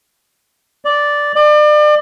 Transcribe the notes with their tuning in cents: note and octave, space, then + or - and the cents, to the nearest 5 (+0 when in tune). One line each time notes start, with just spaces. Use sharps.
D5 -5
D5 +35